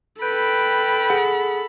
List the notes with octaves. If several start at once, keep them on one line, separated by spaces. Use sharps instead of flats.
A4 B4 G5 B5
G#4 F#5